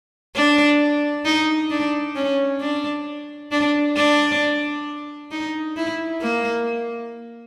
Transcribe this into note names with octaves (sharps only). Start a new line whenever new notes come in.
D4
D#4
D4
C#4
D4
D4
D4
D#4
E4
A#3